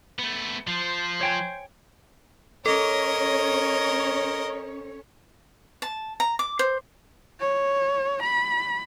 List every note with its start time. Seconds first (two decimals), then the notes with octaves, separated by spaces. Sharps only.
0.19 A3 B3
0.67 F3 C5
1.21 C#5 G5 G#5
2.66 C#4 A4 A#4 C#5 D#5
5.82 A5
6.20 A#5
6.39 D6
6.59 C5
7.40 C#5
8.22 B5